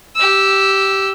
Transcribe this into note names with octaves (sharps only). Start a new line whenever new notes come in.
G4 E6